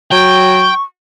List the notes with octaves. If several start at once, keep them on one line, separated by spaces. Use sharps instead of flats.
F#3 G5 C#6